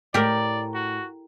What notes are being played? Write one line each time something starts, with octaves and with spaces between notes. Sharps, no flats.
A2 G4 A#4 D5
F#4